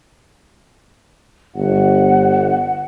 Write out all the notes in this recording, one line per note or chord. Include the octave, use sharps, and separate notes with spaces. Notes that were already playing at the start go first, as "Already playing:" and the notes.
G1 F#5